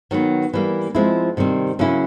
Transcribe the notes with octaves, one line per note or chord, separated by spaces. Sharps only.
D#3 F#3 B3
E3 G3 A#3
F3 G#3 C4 E4
C3 D#3 G3 C4
C#3 F#3 A#3 C#4 E4